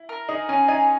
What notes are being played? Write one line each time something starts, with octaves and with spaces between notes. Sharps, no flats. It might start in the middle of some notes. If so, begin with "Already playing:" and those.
Already playing: E4
A#4
D#4 G#4
C#4 G#4
D#4 G#5